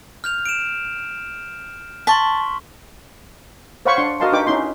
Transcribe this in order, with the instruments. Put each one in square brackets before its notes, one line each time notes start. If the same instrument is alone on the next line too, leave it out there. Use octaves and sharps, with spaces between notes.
[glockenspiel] F6 G6 F7
D7 E7
[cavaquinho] A5 [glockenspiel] C6 C#6 B6
[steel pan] C5 C#5 F5 F#5 B5 C#6
D4 F#5 C6
F#4 A#4 D#5 F5 A5 C6
D4 D#4 G4 B4 G5 D6
C#4 D#4 E4 C6